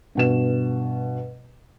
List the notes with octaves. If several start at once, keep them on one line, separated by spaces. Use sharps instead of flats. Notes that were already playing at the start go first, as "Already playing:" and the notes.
G2 B2 E7